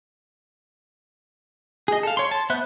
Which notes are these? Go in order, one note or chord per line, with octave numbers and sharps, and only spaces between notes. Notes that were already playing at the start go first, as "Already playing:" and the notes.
G#4 D#5
A4 F5
C#5 C6
A5
B3 C5 E5 F#6